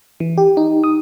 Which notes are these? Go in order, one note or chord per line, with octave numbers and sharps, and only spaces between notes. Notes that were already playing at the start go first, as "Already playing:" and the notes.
E3
G4
D#4
D#6